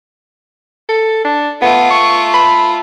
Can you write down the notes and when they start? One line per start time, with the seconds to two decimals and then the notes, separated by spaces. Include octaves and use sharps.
0.89 A4
1.24 D4
1.62 A3 B3 F4
1.91 C#6
2.34 B5